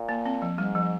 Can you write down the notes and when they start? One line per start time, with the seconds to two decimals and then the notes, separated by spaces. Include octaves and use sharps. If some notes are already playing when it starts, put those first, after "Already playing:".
Already playing: A#2
0.09 A#3
0.26 C4
0.42 F3
0.58 G#2 G3
0.75 F3